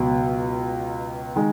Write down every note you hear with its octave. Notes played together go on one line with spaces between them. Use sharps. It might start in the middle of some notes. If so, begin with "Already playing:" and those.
Already playing: C#2 B2 F#3
D#3 G#3